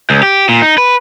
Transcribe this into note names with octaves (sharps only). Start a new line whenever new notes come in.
C#2
G4
A#2
D#4
B4